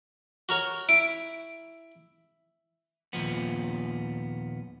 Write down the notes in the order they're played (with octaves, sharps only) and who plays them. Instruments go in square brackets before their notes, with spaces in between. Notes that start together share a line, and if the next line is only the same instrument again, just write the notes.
[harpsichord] F#4 A#4 C#5
[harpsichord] E4 [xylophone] D7
[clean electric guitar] D#2 A#2 F3 B3